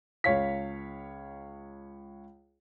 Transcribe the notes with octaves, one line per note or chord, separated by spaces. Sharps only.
C#2 C#5 F5 B6